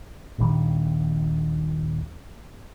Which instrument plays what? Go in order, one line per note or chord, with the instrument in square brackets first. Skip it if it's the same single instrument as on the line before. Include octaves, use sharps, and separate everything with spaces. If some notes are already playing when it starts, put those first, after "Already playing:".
[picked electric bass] D#1 A#1 D#3 G3